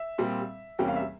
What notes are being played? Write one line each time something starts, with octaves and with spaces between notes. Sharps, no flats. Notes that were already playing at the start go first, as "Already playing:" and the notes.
Already playing: E5
A#2 G3 C4
E2 C3 G3 A#3 C#4 G5
F5
E5